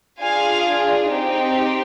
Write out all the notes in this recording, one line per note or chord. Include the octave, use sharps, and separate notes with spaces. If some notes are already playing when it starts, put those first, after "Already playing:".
D4 F4 G#4 F5 G#5
C4 D#4 G4